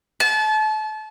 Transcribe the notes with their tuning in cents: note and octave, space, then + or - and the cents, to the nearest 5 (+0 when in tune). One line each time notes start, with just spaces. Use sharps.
A5 -30